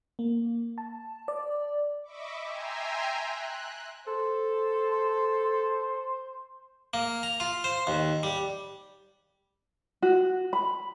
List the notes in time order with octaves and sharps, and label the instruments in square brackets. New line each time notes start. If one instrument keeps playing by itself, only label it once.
[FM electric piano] A#3
A5
D5
[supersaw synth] D#5 E5 B5 C#6 D6
E5 G5 G#5 A#5 C6
F#6
[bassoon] A4 [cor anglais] C5
[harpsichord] A#3
A#5
F4
C5
D#2
G3
[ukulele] F#4
B5